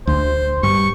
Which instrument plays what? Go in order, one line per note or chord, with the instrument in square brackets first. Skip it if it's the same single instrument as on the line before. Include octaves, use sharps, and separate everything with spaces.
[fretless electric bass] D2 [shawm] C5
[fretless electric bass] G2 [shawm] C#6